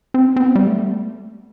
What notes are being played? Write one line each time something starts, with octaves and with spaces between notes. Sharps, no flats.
C4
C4
B3
G3
A3